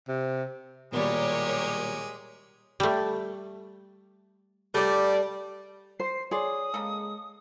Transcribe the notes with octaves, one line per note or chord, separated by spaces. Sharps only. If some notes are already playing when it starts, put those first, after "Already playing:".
C3
A#1 B2 D#3 G3 G#3 G4 A#4 C#5
G3 A3
G3 A3 D5
C5 C7
B3 G#4 C#5 D5 C6 D#6
C#3 G#3 A#3 A4